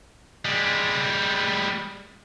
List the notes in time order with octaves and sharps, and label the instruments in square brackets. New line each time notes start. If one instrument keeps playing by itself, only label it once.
[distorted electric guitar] G3 G#3